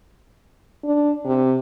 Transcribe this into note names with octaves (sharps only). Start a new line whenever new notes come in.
D4
C3